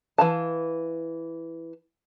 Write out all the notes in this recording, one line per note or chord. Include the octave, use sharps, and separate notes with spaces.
E3 F5 A5